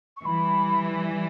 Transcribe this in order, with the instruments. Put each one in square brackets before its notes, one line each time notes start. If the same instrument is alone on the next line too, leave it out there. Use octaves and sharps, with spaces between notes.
[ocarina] C#6
[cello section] E3 G3 [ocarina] B5